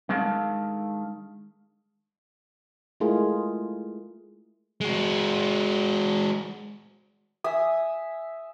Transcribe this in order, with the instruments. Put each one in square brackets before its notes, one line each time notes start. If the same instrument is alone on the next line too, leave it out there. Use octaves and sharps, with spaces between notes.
[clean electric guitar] D#3 G#3 D4 A4 F5 A5
[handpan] G#3 A3 E4 F4 G#4 A#4
[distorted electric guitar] G#3 F#4
[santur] E5 G#5 D#6